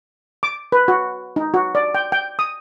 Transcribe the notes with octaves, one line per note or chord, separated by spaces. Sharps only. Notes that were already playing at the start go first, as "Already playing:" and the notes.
D6
B4
F#4
D#4
F#4
D5
G5
G5
D#6